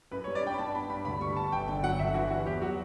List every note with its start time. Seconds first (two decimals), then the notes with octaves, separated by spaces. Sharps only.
0.11 F#2 B4
0.24 C#5
0.27 G3
0.35 D5
0.43 D4 G5
0.54 B5
0.59 G2 A5
0.74 B3 B5
0.89 G2 B5
1.05 D2 B5
1.21 G3 C#6
1.36 B3 A5
1.52 G1 G5
1.68 D3 G5
1.83 F#3 F#5
1.99 G1 E5
2.14 E3 F#4
2.30 G3 F#4
2.46 E2 G4
2.61 F#3 F#4